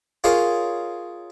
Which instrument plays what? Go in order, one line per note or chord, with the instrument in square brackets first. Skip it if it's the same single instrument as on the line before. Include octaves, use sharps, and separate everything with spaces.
[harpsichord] F4 G#4 A#4 C#5 D#5